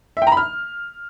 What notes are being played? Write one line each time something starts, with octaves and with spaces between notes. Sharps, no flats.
E5
G5
A#5
B5
F6